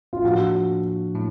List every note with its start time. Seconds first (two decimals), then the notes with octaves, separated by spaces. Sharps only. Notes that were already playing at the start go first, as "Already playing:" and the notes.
0.13 F4
0.24 A2 F3 A#3 D4 F#4
1.15 A2